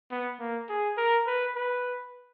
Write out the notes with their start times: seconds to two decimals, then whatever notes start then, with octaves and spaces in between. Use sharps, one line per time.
0.11 B3
0.40 A#3
0.69 G#4
0.98 A#4
1.27 B4
1.56 B4